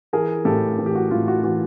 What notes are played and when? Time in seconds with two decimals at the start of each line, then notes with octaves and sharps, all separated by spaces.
0.13 E3 G#4 A#4
0.45 A2 G4 A4
0.79 E3
0.86 G4
0.95 F#4
1.11 A2 F4
1.28 F#4
1.43 E3 F#4